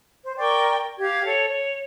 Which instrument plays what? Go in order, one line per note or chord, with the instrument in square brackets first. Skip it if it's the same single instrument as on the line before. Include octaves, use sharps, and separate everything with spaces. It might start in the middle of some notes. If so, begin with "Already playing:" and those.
[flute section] C5
A#4 D5 G5 C#6
G4 F5 G#6
A4 C#5
C#5